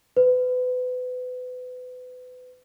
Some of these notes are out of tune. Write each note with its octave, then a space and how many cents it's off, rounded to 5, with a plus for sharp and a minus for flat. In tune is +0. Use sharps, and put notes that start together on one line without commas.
B4 +30